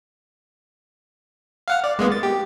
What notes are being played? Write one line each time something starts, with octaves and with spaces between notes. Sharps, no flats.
F5 F#5 F6
D5
G#3 A#3 B3
A6
G4